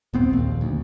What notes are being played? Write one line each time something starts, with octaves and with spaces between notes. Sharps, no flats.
D#1 B3 C4
A#1 D#2
D2